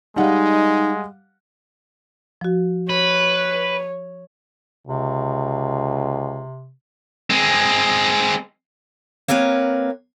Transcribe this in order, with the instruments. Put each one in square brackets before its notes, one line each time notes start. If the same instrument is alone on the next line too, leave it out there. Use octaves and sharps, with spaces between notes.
[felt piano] G3 F5 F#5 [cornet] G#3 [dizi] D#4
[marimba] F3 F#4
[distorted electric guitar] B4 [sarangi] C#5
[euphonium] C#2 [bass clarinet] C3
[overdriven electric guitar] G#3 C4
[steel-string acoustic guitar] A#3 C4 A#4 B4 C#5